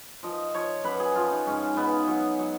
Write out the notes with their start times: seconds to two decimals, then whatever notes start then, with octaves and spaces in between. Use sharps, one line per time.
0.23 F3 D#5
0.54 F3 C#5
0.84 F#2 B4
1.00 G#4
1.15 F3 F4
1.31 D#4
1.46 G#2 C#4
1.77 G#2 B3
2.08 F#3
2.39 F#3